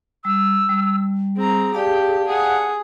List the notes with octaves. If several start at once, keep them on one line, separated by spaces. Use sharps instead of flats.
G3 E6
G3
C4 G#4 A#5
G4 D5 F5 G5 A5
G#4 F#5